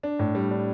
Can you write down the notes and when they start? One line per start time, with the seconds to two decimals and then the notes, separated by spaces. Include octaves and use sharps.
0.03 D4
0.19 A2
0.35 G3
0.51 D4